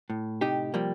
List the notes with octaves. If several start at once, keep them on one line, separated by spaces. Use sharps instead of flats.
A2
C3 D#4 G4
F3 G3 A#3